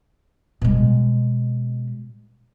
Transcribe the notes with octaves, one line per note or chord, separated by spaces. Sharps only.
B2 G#3